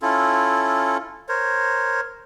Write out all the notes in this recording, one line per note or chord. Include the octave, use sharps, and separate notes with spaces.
C#4 E4 F4 A4
A#4 C5 C#5